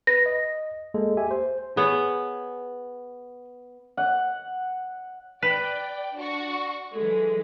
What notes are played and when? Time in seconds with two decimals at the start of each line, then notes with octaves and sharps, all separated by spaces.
0.07 B4 A#6
0.26 D#5
0.94 G#3 A#3 A4
1.17 G4 E5 G#5
1.31 C5
1.77 B3 G#4 C#5
3.97 F#5
5.42 B4 D5 G5
6.15 D4 F#4 C#6
6.94 E3 F#3 G#3 A4